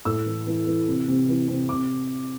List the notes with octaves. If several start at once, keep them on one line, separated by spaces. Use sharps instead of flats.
A2 E6
E3
E3
E3
C3
C3
E3
C3
C3 D6